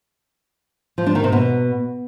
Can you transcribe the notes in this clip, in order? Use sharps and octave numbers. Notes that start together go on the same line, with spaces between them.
F3
D4
D#3
C3
B2